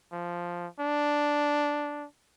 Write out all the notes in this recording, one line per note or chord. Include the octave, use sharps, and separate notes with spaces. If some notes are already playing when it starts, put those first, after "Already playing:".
F3
D4